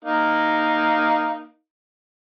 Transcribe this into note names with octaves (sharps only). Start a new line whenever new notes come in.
A#3 D#4